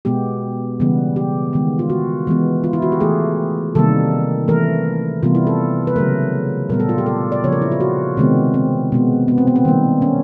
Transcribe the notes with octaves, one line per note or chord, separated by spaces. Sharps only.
B2 G#3 B3 G4
C#3 E3 G3 B3
G4
D#3 G#3 B3
F4
F#4
E3 G#3 B3
F4
E4
F#4
G4
E3 A3 G#4
C3 D#3 G3 A#3 A4
E3 A3 A#4
C3 E3 G3 B3 F4
E4
A4
B4
C#3 F#3 A3 A#4
A#2 G3 B3 A#4
A4
F4
G4
A4
D5
C#3 F3 A#3 C#5
A#4
E4
F4
F#4
C3 D#3 G#3 B3 C4
C4
B2 G#3 B3
B3
C4
B3
C4
D#3 G3 A#3
C#4